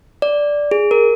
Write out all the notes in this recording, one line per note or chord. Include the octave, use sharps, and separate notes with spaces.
D5
G#4
A#4